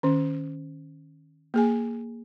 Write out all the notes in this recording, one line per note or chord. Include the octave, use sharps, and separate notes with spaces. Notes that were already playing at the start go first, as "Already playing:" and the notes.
D#3 C#4
A#3 G#4 G#5